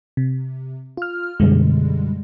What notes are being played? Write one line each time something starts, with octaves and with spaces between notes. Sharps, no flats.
C3
F4 F6
F#2 B2 D3 G3 G#3